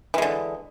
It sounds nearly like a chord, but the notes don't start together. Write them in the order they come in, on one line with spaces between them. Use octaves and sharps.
E3 G#3 D3